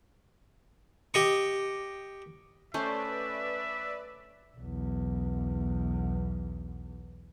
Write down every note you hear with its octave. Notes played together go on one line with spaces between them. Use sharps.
G4 D#5 C#6
A3 C#4 B4 C5 D5 E5
B1 E2